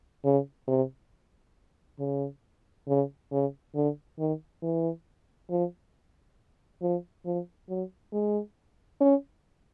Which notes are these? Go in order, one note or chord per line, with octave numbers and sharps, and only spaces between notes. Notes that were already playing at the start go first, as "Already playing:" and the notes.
C#3
C3
C#3
C#3
C#3
D3
D#3
E3
F3
F3
F3
F#3
G#3
C#4